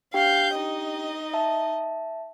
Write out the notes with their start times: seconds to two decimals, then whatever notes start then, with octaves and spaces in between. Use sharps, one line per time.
0.14 D4 G4 F5 G5 G6
0.55 D#4 D#5
1.34 E5 A5